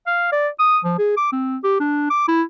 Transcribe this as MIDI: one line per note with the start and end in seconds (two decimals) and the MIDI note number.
0.07 0.28 77
0.32 0.49 74
0.59 0.79 87
0.84 0.94 53
0.99 1.13 68
1.17 1.28 86
1.33 1.57 60
1.64 1.79 67
1.80 2.07 62
2.11 2.27 86
2.28 2.43 64